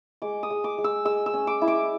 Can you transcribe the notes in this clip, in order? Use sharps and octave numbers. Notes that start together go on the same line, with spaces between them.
G#3 D6
D#6
G#3
D6
G#3
E6
G#3 E6
E6
C#4
D6
E4
D6